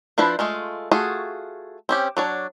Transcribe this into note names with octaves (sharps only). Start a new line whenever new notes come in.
F3 D4 E4 B4 C5
G#3 A3 F4
A3 F4 F#4 G#4
C4 C#4 G4
F#3 D4 C#5